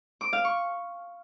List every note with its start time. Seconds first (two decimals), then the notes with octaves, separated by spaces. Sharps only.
0.21 D6
0.33 F5
0.45 C#6